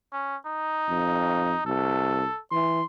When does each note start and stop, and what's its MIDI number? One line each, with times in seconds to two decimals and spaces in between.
0.13 0.36 61
0.46 1.61 63
0.89 1.54 41
1.66 2.25 36
1.66 2.39 69
2.51 2.81 52
2.51 2.85 84